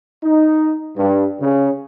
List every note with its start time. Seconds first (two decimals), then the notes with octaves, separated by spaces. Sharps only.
0.24 D#4
0.98 G2
1.41 C#3